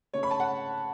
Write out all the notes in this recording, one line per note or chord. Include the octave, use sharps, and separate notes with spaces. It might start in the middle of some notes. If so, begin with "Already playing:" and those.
C#3 A3 C#5
B5
A5
F#5